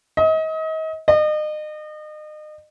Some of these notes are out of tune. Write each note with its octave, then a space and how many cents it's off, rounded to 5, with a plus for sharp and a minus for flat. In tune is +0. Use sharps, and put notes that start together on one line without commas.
D#5 +35
D#5 -35